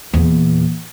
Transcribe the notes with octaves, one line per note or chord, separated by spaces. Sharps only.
E2 A#2